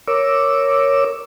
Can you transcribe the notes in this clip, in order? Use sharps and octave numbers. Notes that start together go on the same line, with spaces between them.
A#4 C#5 D6 E6